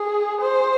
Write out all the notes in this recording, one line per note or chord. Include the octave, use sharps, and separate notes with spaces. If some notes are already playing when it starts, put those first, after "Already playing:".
Already playing: G#4
C5